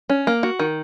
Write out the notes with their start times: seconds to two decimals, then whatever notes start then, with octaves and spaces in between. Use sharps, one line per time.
0.10 C#4
0.27 A#3
0.43 F#4
0.59 D#3